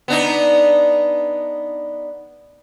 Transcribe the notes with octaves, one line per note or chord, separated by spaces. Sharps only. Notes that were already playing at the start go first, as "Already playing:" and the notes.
B3 D4 D#4